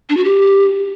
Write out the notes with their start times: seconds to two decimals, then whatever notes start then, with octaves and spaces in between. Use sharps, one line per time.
0.09 D4
0.17 F#4
0.25 G4